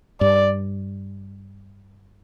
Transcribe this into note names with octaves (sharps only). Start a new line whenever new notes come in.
G2 D5